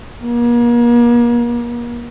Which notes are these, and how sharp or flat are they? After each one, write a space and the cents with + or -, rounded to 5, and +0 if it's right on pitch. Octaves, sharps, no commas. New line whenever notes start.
A#3 +40